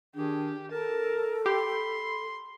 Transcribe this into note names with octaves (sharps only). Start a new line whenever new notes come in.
D#3 D4 G4 G#4
A4 A#4 A5
G4 B5 C6